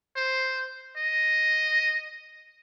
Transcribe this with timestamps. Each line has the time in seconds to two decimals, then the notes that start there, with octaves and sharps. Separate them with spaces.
0.16 C5
0.97 D#5